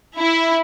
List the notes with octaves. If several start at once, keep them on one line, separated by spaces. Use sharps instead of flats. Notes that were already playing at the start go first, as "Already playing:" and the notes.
E4